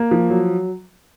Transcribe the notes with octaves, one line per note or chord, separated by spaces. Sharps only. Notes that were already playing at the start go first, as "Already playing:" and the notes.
Already playing: A#3
F3
F#3